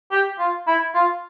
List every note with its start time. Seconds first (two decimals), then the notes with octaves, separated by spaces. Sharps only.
0.11 G4
0.39 F4
0.67 E4
0.95 F4